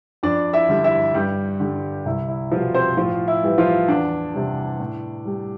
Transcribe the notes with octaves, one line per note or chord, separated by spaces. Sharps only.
F2 D4 D5
E4 E5
D3 G3
E4 E5
G2 G3 G4
D3 G3
C2 E4
E4
B2 F3 G3 F4
C4 C5
A2 F3 F4
E4
E3 G3
F3 F4
E2 D4
C3 G3
A2
G3